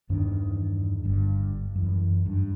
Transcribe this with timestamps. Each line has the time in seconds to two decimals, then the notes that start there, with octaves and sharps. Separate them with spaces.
0.09 E2 G2 D#3 D4
1.03 G1 G2
1.76 F#2 E3
2.26 G2